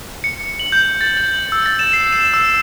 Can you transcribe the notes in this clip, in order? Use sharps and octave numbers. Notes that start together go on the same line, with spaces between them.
C#7
F#7
G6
A6
F#7
E6
A6
E7
C7
E7
E6